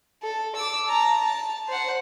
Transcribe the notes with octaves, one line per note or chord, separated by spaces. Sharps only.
A4
D6 E6
A5 A#5
A5
C5 F#5